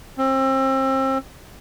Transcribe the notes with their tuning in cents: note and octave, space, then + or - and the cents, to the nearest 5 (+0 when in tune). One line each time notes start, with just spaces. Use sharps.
C4 +30